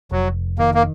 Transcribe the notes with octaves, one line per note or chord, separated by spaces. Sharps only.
F1 F#3
D#3 A#3
A#3